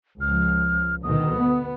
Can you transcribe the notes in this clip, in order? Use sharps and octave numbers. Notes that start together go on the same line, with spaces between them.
C#2 F3 F6
D2 B2 D#3 D#6
B3